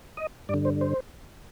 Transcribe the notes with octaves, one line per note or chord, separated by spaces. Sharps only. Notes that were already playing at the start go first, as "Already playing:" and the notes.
D#5
G2 D3 D5
C5
C5